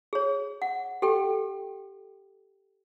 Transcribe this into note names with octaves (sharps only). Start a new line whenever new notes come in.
G#4 C#5
F#5
G4 A4 G5